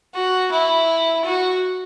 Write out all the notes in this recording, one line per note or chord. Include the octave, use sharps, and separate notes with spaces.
F#4
E4
F#4